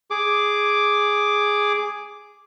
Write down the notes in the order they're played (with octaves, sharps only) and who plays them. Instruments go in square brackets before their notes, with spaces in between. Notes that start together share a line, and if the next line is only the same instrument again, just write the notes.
[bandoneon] G#4 D6